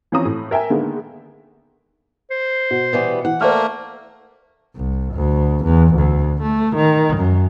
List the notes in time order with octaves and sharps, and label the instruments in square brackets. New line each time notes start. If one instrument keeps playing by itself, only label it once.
[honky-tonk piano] E3 F3 C4 C#4 A#5 D#6
A2
A#4 E5 G5 G#5
D3 D#3 G#3 A#3 B3
[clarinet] C5
[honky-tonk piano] B2
[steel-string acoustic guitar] E3 G3 B3
[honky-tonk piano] E3 [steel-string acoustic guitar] F#5
[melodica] A3 A#3 [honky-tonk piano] C5 D5 F6
[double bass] C2
D2
E2
D2
A3
D#3
F#2